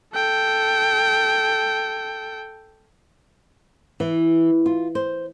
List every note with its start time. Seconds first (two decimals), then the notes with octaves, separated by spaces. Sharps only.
0.14 A4 G5
4.00 E3
4.66 F4
4.95 C5